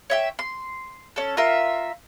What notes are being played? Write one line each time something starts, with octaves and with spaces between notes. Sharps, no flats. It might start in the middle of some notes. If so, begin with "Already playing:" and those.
C#5 E5 G5
C6
C#4 A4
F4 A#4 E5